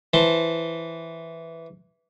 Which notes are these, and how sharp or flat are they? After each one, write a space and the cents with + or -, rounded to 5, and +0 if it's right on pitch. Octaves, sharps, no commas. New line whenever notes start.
E3 +0 C5 +0 A5 +0